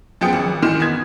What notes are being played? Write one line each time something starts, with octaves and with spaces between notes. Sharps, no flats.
F#2 F3 B3 G#4 G5 C#7
G#1
D#3 E3 C6 F6 E7
B3 G#6